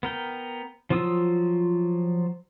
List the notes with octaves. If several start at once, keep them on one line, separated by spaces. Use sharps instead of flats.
B3 A#4 G5
F3 F#3 F4 D#6 E6